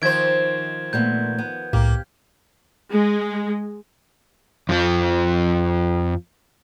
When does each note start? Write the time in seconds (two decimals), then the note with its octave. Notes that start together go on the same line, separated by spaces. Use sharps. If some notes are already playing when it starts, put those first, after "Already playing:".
0.02 D#3 F3 C5 G#6 D7
0.93 A#2 A3 B3 G6
1.38 B3
1.73 C2 A2 A#3 G4
2.91 G#3
4.69 F2 F3